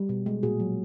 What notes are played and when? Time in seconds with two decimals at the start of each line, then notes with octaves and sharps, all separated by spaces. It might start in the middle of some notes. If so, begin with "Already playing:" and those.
Already playing: G3 G4
0.09 B2
0.26 G#3
0.43 A#2 F#4 G#4
0.60 F#3